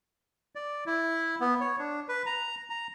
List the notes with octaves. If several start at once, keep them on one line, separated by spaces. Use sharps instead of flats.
D5
E4
B3
C#5
D4
B4
A#5
A#5